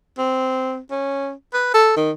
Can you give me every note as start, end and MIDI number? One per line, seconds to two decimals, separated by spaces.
0.18 0.78 60
0.91 1.31 61
1.53 1.72 71
1.74 1.94 69
1.97 2.11 51